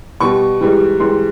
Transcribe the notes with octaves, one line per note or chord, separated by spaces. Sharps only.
B2 G3 C#6
G#2 E3 G3
G#2 E3 G3 C6